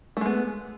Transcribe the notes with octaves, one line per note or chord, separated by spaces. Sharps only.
G#3 A3 B3